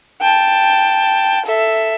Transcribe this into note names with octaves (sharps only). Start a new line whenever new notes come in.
G5 A5
A4 E5